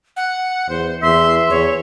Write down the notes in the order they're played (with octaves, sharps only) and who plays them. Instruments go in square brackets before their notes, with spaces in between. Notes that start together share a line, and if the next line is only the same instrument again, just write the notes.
[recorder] F#5
[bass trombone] E2 [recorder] C5
[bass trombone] E2 [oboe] E5 [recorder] C6
[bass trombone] E2 [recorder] C#5